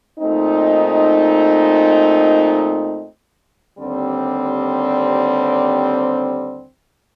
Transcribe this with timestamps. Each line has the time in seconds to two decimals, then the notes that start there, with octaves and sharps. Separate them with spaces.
0.19 A#2 A3 C4 D#4
3.78 D#2 D3 G3 C4